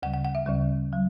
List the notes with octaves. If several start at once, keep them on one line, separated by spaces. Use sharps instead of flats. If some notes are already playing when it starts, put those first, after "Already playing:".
D2 C#3 G3 F#5
F#5
F#5
E5
D2 C#3 G3 E5
F#3